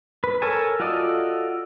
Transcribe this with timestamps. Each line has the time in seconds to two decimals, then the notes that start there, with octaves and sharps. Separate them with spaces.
0.24 B4
0.42 A4 A#4 C#5 G#5 A5
0.80 F4 F#4 A4 D5 D#5